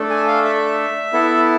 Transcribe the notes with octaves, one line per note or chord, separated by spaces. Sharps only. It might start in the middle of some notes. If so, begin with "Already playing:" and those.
Already playing: A3 D4 A4
G#5
F5
E5
B3 E4 A4